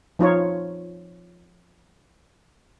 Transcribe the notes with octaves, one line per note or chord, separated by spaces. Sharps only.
F3 D#4 F4 C#5